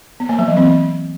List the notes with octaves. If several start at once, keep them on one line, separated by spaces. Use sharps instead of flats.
B3
A#3
F#3
E3
C4